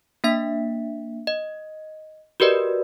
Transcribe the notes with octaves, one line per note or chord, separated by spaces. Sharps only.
A#3 D4 E5 B6
D#5
F#4 G4 A#4 B4 D5 D#5